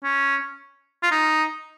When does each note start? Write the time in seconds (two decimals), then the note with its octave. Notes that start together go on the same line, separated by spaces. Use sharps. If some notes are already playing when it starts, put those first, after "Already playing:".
0.04 C#4
1.03 F4
1.11 D#4